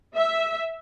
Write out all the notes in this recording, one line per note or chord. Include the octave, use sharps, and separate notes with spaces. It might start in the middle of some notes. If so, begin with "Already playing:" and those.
E5